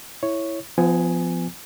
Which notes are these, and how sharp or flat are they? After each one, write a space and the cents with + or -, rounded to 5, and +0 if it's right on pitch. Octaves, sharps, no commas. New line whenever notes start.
E4 +0 C#5 +0
F3 -5 B3 +35 G#5 +0